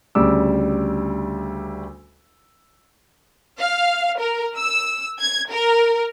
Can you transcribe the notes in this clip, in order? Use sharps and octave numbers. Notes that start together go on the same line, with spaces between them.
D2 C#3 G3 D6 E6
F5
A#4
E6
G#6
A#4